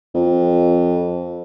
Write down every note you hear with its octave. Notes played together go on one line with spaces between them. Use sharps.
F2